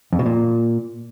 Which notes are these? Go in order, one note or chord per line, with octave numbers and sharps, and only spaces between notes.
F2
B2
A#2